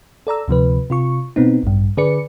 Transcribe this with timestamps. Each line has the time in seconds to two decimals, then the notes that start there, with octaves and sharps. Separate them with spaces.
0.27 A4 D5 A#5 E6
0.48 D2 C3 F3 B4
0.90 C3 F4 C#6
1.36 B2 B3 C4 D#4
1.63 A1 G2
1.97 D3 G#4 B4 D5 C#7